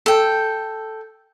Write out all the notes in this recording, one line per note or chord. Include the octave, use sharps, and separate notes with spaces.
A4 G5